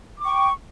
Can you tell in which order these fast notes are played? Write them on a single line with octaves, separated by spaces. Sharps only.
D6 C#6 G5